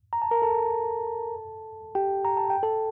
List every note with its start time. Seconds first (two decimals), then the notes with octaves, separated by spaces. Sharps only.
0.13 A#5
0.22 A5
0.31 A#4 A#5
0.42 A4 A5
1.95 G4 G5
2.25 A#5
2.37 A5
2.50 G5
2.63 A4 A5